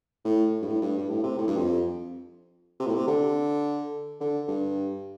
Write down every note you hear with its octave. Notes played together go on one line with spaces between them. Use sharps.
A2
G2
A2
G2
G2
A2
C3
A2
G2
F2
C3
A2
C3
D3
D3
G2